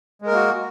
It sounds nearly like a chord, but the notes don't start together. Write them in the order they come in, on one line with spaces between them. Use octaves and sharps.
G#3 A#4 A#3 F#4